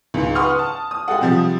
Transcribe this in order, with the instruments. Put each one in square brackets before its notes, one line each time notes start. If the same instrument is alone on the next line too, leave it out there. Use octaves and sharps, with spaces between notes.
[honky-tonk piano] C#2 G#2
B4 F#5 C6 C#6 D#6 F6
A5
D#6
G#3 G4 A4 F#5
C3 F3 G3